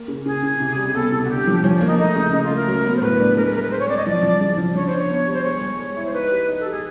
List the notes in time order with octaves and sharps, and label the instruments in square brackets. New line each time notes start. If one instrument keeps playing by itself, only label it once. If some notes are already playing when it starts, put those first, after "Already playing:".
Already playing: [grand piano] A#3
C#3
[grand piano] C#3 [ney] G#4
[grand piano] C#3
C3
G3
[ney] G#4
[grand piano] B3 [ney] A4
[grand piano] C3
[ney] F#4
[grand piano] D3 [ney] G4
[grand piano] F3
[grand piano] F3 [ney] C#4
[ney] D4
[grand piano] A#3
[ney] D#4
[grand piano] A3 [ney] D#4
[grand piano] C#3
[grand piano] C#3 [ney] D#4
[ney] F4
[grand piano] A3
[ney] A#4
[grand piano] F#3
B3
[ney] C5
[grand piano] A2 [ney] B4
[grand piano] D4
[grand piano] G#3 [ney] A#4
[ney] B4
[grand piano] G#3 [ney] A#4
[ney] B4
[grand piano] G#3 [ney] C5
[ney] C#5
[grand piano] C4 [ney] D5
[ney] D#5
[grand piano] F3 [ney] D5
[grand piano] F3
C#3
F3
[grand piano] D4 [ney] C#5
[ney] C5
[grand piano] D4
[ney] C#5
[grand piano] B3
G3
[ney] C5
[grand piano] G#3 [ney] C#5
[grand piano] G#3
G#3
E4
[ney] C5
[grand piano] D#4 [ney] B4
[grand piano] G4
D#4
[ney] A4
[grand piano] G4
[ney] G#4